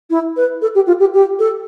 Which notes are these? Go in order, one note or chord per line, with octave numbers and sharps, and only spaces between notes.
E4
B4
A4
G4
F4
G4
G4
A4